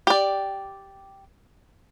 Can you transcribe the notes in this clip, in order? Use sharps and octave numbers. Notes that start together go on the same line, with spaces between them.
G4 D5